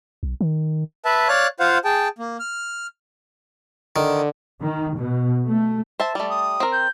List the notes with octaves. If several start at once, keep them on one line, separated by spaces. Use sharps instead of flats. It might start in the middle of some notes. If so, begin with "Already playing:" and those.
B1
D#3
B4 E5 A5
C#5 D5 F5 F#6
F4 C5 F5 F#5
G#4 G5 A5
A#3
F6
D3 D#3
D#3
B2
A3
C5 E5 A5
G3 A3 D5
D#6
C4 A#4
G6